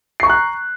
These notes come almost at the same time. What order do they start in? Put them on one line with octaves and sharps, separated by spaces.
C7 C#6 A#5 F#6